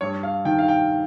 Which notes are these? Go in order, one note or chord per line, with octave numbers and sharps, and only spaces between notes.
G2 C#5
F5
D#3 G5
F5
G5